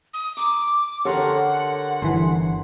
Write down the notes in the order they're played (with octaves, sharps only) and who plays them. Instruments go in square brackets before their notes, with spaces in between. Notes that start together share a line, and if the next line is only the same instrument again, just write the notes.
[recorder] D#6
[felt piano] A#5 [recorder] D6
[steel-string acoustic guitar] D3 A#4 C#5 [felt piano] G4 A4 C6 [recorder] F#5
[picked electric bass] G1 E3 [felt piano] C6